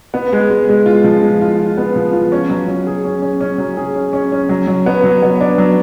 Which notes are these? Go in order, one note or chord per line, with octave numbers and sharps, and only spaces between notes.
B3
G#3
G#3
G#3
F4
F3
G#3
F4
F4
B3
F3
F4
C#4
F#3
F#3
G#4
C#4
C#4
C#4
F#3
G#4
C#4
C#4
C#4
F#3
F#3
B3
F#3
B3
D4
F#3